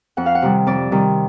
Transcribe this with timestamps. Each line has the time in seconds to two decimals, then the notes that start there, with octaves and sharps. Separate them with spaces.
0.17 F2 F#5
0.26 F5
0.35 F#5
0.42 C3 D#3 G3
0.67 F2 D5
0.92 C3 D#3 G3